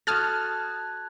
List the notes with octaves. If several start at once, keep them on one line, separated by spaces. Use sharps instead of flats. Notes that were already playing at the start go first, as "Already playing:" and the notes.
F#4 A4 A5 D#6 F6 F#6 G#6 A6